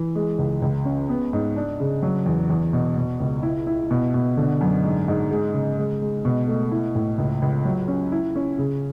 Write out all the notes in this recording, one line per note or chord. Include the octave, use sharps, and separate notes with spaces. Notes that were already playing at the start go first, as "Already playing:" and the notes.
Already playing: E3
G#3
C#2
C#2
C#4
B3
G#2
D4
C#3
F#3
E2
E2
B2
B2
C#2
E4
E4
B2
B2
D3
F#2
G#2
G#2
G#3
C#3
G#3
G#3
B2
A3
E4
A2
C#2
C#2
F#3
C#4
E4
C#4
C#3